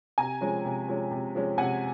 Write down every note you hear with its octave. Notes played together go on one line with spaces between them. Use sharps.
C3 G#5 A#5
F3 G#3 C#4
C3
F3 G#3 C#4
C3
F3 G#3 C#4
C3 F#5 G#5